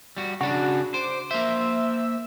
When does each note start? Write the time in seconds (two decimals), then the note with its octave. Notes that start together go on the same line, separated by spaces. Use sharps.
0.17 G3 F#4
0.41 C#3 D4 F#4
0.94 C5 D6
1.31 A#3 C5 E5